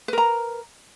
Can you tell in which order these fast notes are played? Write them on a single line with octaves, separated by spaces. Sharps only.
B4 A#4 A#5